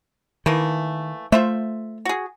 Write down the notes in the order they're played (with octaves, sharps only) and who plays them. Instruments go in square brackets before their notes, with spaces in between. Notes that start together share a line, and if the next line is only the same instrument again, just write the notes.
[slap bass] D#3 [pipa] E3 A3 A#3
[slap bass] A3 [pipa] F4 C5 E5
[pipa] F#4 G#4